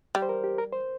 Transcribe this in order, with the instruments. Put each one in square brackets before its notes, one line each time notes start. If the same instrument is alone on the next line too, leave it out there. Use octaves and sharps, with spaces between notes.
[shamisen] G3
[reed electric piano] C5
A#4
G4
A#4
C5